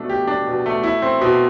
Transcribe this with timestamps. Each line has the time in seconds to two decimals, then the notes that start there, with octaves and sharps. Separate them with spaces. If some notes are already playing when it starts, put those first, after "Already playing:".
Already playing: B2 A3 D4
0.09 G4
0.27 D4
0.47 B2
0.66 A3
0.84 E4
1.02 C4
1.21 B2